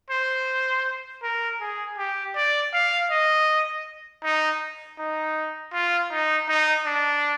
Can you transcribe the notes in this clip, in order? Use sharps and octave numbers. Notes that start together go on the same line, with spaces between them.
C5
A#4
G#4
G4
D5
F5
D#5
D#4
D#4
F4
D#4
D#4
D4